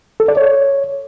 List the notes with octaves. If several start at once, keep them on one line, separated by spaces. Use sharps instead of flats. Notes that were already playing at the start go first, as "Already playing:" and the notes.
A4
D5
C#5